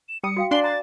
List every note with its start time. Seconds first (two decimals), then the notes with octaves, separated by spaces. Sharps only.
0.09 E7
0.23 G3 D#6 C#7
0.37 F#4 F5 G5
0.51 D4 D5 F5 G#5 A#5 C6 F#6 G7
0.64 A#5 A6